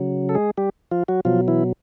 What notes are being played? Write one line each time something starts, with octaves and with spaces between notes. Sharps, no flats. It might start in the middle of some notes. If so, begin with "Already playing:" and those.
Already playing: C#3 F#3
A4
G#3 G#4
G3 G4
F3 F4
F#3 F#4
B2 F3 F#3 F4
E3 E4